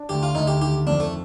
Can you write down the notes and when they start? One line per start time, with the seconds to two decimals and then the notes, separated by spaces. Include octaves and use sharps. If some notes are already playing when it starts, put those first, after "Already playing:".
Already playing: D4
0.09 D2 G4
0.23 F4
0.35 D2 D#4
0.47 G4
0.61 D#3 G4
0.87 F2 D4
1.00 A3